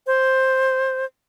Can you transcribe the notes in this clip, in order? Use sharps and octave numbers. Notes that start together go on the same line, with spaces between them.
C5